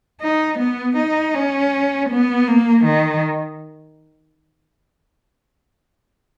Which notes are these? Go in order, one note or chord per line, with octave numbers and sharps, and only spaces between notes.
D#4
B3
D#4
C#4
B3
A#3
D#3